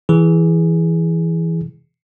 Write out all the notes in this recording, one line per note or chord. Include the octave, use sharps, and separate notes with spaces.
E3 G#4